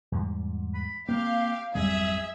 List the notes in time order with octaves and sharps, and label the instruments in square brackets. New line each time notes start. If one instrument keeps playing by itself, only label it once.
[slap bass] E2 G#2 G3
[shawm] B5
[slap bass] A#3 C4 [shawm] G4 [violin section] F5
[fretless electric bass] G#1 F2 G3 [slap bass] F#3 [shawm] G#4 [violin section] E5